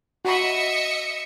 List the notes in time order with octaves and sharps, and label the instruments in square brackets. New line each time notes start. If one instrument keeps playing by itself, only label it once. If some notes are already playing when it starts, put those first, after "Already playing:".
[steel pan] F#4 B5 [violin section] D#5 E5 C#7